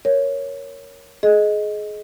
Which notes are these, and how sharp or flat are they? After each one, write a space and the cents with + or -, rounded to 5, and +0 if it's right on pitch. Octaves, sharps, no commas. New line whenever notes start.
A#4 +0 C#5 +0
G#4 +25 D#5 +0